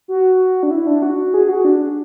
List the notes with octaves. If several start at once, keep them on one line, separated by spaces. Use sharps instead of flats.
F#4
D4
E4
D4
F#4
G#4
F#4
D4